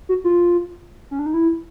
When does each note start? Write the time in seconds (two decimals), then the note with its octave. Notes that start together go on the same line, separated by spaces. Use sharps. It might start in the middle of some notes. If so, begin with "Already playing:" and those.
0.09 F#4
0.24 F4
1.11 C#4
1.19 D4
1.26 D#4
1.34 E4